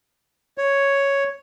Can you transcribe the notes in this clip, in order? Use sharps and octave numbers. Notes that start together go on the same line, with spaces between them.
C#5